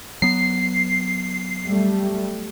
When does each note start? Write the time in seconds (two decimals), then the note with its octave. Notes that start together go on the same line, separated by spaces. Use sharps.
0.22 F#3 B3 C7
1.67 G3 A3